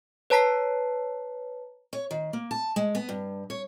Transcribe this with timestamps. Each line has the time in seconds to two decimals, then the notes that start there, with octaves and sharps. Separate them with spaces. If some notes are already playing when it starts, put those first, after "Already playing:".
0.30 B4 C#5 A5 A#5 B6 C7
1.93 C#5
2.11 D#3
2.33 A#3
2.51 A5
2.76 G#3
2.95 B3
3.09 G2
3.50 C#5